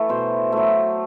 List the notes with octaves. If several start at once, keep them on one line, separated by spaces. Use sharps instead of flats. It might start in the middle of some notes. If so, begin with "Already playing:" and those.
Already playing: E3 A3
B2 C5
F#3 A3